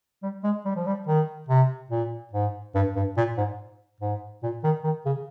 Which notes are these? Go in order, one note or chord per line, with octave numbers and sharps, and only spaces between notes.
G3
G#3
G3
F3
G3
D#3
C3
A#2
G#2
G2
G2
A#2
G#2
G#2
A#2
D#3
D#3
C#3